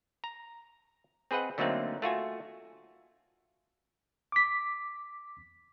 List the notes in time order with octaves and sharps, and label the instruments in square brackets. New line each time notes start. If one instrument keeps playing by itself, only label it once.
[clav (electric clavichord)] A#5
C4 G#4 B4 D#5 F#5
D3 F#3 A3 A#3 C4 D#4
A3 F4 F#4 G#5
[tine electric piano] D6 B6